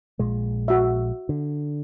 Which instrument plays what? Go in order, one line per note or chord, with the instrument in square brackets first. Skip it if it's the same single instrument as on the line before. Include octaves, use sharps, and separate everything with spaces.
[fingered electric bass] A#1 A#2 G#3
[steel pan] F#4 E5
[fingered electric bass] D3